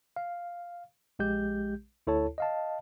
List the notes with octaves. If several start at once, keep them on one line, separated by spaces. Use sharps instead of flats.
F5
A#1 G#3 G4 G6
D2 E4 A4 C#5 A5
D#5 F5 A5